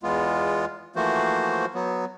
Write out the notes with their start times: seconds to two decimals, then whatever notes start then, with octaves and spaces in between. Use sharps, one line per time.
0.03 E2 G#3 B3 F4
0.96 E3 F3 A3 A#3 F#4 C5
1.75 F#3 B3